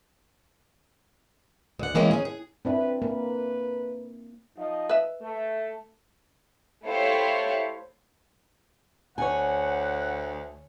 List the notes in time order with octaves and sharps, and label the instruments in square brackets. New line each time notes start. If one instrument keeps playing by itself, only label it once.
[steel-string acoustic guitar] D2 F#5
E3 G#3 A#3 C4 C#4
C#4 G#4
G#4
[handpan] C4 D4 E4 [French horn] B4
[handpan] A#3 [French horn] B4
[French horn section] F3 D#4 D#5
[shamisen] B4 E5
[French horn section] A3
[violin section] A3 E4 G4 C5 C#5 F5
[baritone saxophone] D2 [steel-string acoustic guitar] C#5 G#5 [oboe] F#5